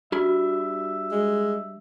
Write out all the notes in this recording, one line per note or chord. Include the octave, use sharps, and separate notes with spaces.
G3 D4 F#4 E5 B5
G#3